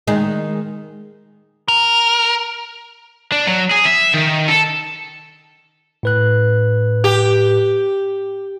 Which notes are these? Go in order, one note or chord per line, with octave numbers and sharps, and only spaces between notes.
D#3 G#3
A#4
D4
F#3
G#4
E5
D#3
A4
A2 B4 F#6
G4